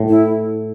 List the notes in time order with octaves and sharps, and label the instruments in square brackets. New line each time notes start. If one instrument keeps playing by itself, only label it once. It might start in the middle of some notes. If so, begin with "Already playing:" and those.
Already playing: [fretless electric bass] A2
[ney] E4